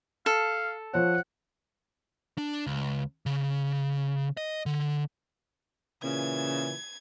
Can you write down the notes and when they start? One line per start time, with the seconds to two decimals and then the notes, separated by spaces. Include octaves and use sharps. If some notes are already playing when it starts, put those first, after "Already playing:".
0.26 A4 F5
0.93 F3 C5 C#5 F#5
2.38 D4
2.67 C#2
3.26 C#3
4.37 D#5
4.66 D3
6.03 A#2 C#3 E3 G#6